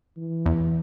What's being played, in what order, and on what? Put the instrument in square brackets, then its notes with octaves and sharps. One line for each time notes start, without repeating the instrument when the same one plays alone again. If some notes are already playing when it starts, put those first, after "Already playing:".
[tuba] E3
[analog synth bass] E2